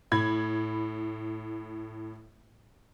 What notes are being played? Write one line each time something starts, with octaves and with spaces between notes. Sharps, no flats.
A2 B5 G#6